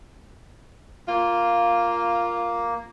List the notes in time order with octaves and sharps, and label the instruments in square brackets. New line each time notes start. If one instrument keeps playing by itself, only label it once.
[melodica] A#3 [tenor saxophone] F4